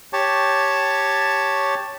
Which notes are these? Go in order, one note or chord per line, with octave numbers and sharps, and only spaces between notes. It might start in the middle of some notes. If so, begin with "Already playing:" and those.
G4 C#5 A5